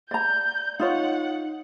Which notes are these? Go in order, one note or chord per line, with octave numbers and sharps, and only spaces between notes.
D5 A#5 G6
D#4 F4 C#5 F#5